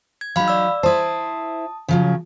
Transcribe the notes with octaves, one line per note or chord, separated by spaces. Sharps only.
G#6
F#3 D#4 F5 B5
D5 E6
E4 C5 A5 D#6
C#3 F3 F#3